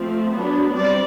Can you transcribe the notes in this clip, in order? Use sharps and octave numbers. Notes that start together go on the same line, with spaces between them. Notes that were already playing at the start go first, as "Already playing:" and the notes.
Already playing: F3 A3 C4
F#3 B3 D4
G3 C4 D5